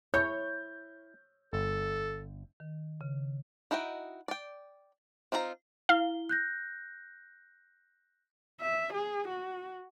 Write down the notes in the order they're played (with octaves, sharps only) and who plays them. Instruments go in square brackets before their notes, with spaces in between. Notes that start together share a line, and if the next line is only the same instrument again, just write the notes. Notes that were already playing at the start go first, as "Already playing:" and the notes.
[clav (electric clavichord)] E4 [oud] C#5 [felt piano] G6
[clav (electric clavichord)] G1 [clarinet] A4
[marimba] D#3
C#3
[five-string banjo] D#4 E4 F#4 D#5 G5
D5 G5
C4 D#4 F4 G#4 A#5
[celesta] E4 G7 [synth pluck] F5
[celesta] F#6 G6 A#6
[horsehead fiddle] E5
G#4
F#4